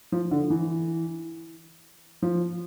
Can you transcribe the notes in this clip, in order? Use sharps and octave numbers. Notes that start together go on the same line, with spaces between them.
F3
D3
E3
F3